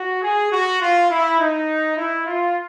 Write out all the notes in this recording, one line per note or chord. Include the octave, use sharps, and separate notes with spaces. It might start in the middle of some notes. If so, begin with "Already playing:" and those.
Already playing: F#4
G#4
F#4
F4
E4
D#4
E4
F4